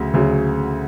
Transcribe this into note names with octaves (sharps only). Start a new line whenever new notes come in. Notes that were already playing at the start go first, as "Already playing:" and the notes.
Already playing: D2 C#3 F#3
D2 C#3 F#3